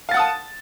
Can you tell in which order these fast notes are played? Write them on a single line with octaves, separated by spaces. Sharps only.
F5 A6 F#5 D#6 A5